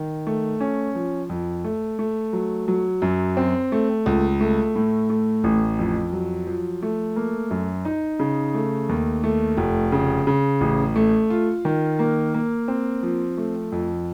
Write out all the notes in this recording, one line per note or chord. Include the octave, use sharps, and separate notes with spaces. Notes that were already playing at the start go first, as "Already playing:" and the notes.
Already playing: D#3
A3
C#4
F3
F2
A3
A3
F#3
F#3
F#2
C4
A3
C#2
A3
A2
A3
A1
F2
F#3
F3
A3
A#3
F#2
D#4
C#3
A3
D#2
A3
F1
C#3
C#3
A1
A3
F4
D#3
A#3
A#3
C4
F3
A3
F2